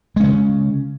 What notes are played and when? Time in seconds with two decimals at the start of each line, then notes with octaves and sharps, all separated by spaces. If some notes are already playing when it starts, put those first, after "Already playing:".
0.16 G#3
0.20 C#4
0.23 C#3